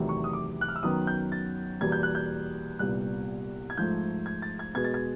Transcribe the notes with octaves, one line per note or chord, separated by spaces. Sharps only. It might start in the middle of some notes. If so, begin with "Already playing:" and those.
Already playing: E2 C3 D#3 F#3 A3
C#6
D#6
D6
F#6
F6
E6
F#2 D#3 F#3 B3 D#6
G6
A6
E2 B2 G3 A#3 G#6
G6
F#6
G6
C2 A#2 G3 B3 F#6
G#6
G#2 F3 A3 G6
G#6
A6
G#6
B2 G#3 B3 G#6
A6
G#6